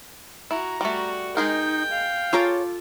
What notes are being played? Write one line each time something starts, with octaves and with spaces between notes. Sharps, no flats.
E4 F#4 A#5
G3 A3 F#4
G#3 D#4 G#4 A#4 G5
F5
F4 G#4 A4 C#5 A#5 D6